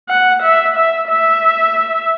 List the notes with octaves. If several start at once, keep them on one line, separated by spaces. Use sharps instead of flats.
F#5
E5
E5
E5